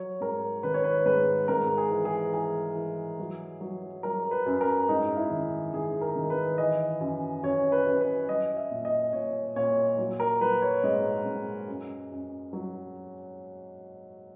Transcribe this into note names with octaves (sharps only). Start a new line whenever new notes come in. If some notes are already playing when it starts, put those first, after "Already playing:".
Already playing: F#3 C#5
G#2 A#4
D#3 B4
C#5
B4
G#2 B4
G#2 A#4
G#4
E3
G#4
E3 G#4
E3
F#3
F#3
F#3 A#4
B4
F#2
A#4
G#2 D#4
E4
D#3
D#3 G#4
A#4
D#3
B4
E3 D#5
F#2
F#2 C#5
B4
F#2
B4
F#3 D#5
E5
A#2
D#5
A#2 C#5
A#2 C#5
F#3
A#4
F#3 B4
C#5
G#2 D#5
G#2
F#2
F#2
F#3